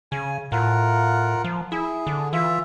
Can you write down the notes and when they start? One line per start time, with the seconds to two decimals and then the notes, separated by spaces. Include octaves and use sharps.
0.12 C#3 G#5
0.52 A2 F4 A#4 F#5
1.44 F3
1.72 E4 G#4
2.07 D3
2.33 E3 F4 E5